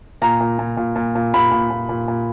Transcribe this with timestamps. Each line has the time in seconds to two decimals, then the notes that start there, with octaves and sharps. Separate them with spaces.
0.22 A#2 A#5
0.41 A#2
0.59 A#2
0.77 A#2
0.96 A#2
1.15 A#2
1.34 A#2 B5
1.51 A#2
1.70 A#2
1.89 A#2
2.08 A#2